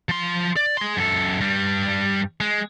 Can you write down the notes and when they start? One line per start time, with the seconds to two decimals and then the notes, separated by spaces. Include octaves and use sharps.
0.09 F3 C6
0.56 D5
0.77 G#4 C6
0.97 F#2 A4
1.41 G2 G3
2.41 G#3